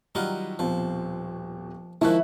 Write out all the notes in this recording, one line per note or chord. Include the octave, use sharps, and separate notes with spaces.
D#3 F#3 G3 D#4 F4 F#5
D#1 B2 F3 C4
D#3 F3 G#3 E4 A5 C#6 F#6